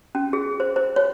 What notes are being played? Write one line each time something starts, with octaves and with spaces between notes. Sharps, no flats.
C#4
G#4
C5
C5
C#5